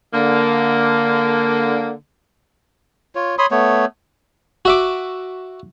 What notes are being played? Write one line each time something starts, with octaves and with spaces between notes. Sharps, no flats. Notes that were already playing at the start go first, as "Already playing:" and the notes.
D3 A#3
F4 C#5
C#5 B5 C6 D#6
A3 B3 C#5
F#4 E5 D6